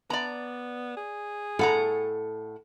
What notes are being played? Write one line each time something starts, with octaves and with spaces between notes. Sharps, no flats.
B3 D5 A#5
G#4
A2 A4 F#5 A#5